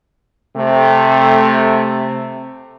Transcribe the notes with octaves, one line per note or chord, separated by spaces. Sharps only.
C3 A3